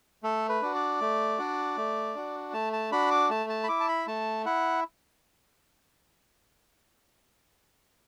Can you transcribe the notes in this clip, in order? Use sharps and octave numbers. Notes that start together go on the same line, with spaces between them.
A3 A4
B4
D4 F#4
D5
A3
D4 F#4
A3
D4 F#4
A3 A5
A5
D4 F#4 B5
D6
A3 A5
A5
B5
E4 D6
A5
B5
A3 A5
E4 F#5